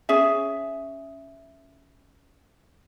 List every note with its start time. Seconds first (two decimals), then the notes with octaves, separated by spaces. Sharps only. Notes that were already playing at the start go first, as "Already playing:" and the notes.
0.09 C#4 G#4 E5